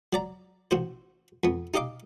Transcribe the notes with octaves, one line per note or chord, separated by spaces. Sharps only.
F#3 D5 A#5
A1 F#4 C5
F2 B3
D#4 G4 D#5 F5 D6